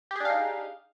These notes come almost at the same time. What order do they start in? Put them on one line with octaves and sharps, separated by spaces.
G4 G#4 D4 F5 D#4